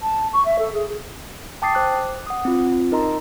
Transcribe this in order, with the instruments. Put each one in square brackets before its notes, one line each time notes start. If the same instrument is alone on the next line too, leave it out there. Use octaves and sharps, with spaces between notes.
[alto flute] A5
C#6
E5
A4
G#4
[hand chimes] G5 A5 D6 D#6 A6 C7
C5 D6 F#6
F#5 D#6
C4 F4
D#4 A#4 D#5 A#5 C6